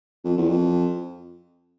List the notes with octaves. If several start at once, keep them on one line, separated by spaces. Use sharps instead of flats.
F2
E2
F2